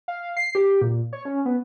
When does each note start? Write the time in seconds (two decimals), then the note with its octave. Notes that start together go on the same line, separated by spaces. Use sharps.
0.08 F5
0.37 C7
0.55 G4
0.82 A#2
1.13 C#5
1.25 C#4
1.45 B3